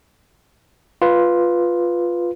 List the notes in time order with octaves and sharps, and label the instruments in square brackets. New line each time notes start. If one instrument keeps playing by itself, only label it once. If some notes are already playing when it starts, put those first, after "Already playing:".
[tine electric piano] F4 B4